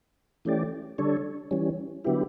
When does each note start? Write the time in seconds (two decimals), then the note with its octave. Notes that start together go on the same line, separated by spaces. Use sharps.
0.45 E3 A3 C#4 G4 D5
0.98 D3 G3 D4 A4 C#5
1.51 E3 G3 C#4
2.04 D3 F#3 B3 E4 G4